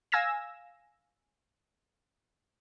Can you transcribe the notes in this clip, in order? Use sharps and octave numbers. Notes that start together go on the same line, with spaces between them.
F5 G#5 E6 G#6 A#6 E7